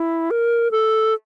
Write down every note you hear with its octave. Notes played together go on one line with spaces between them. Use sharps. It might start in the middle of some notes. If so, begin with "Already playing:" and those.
Already playing: E4
A#4
A4